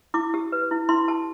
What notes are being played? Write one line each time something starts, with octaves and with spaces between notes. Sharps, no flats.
E4 D6
G4
B4
E4
E4 C6
G4 A5